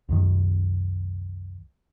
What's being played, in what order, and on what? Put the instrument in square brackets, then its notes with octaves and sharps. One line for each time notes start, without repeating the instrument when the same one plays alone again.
[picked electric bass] C2 F#2 D#3